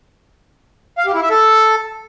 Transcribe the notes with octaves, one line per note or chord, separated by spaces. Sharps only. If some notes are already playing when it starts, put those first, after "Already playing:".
F5
G4
E4
E5
A4